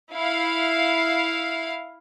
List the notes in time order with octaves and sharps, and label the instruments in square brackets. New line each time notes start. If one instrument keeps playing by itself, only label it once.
[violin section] E4 F5